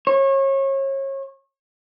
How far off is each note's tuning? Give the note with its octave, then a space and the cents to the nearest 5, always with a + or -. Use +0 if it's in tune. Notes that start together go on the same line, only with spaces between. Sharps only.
C#5 -30